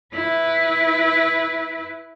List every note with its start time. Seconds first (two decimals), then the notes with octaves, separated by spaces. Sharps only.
0.14 E4 B4